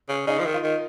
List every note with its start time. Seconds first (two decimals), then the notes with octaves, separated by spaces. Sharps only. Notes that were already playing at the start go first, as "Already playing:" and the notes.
0.09 C#3
0.27 C#3 D#4
0.39 F3
0.46 D#3
0.54 F4
0.63 D#3